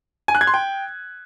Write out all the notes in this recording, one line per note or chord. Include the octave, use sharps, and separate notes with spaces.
G#5
F#6
G#6
C6
G5